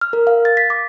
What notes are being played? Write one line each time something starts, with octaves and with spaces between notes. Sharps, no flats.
F6
A#4
F5
A6
B6
D6